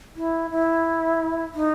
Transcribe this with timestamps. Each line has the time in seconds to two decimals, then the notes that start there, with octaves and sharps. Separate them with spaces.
0.16 E4
0.50 E4
1.54 D#4